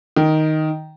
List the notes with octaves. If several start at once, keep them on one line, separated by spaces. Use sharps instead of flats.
D#3